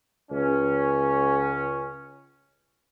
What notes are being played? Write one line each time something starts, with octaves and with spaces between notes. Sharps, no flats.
C#2 C#4